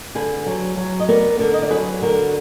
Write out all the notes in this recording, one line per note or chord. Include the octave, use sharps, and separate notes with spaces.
D3 G#4 B4
F#3
F#3
D#5
B3 A#4 D5
D3 A#4 D5
D#5
D5
F#3 G#4 B4
D3 F#4 A#4